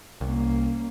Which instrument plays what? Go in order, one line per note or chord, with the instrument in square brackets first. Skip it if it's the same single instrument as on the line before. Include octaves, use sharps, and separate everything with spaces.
[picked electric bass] C2 [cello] A#3 C#4